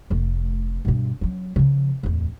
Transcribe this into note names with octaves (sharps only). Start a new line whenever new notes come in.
F1 A3
G2 B2
F#3 C#4
C#3 F3
D1 E2